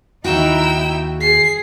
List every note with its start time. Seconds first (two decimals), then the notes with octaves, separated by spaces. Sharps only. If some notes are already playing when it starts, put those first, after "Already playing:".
0.24 D#2 D#4 E4 F#4 G5 E6
1.20 G#4 C7